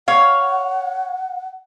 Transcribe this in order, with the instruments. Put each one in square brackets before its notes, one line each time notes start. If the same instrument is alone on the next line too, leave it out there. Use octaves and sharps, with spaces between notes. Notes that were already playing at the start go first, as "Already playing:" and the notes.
[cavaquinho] C#5 [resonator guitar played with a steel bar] F5 [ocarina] F#5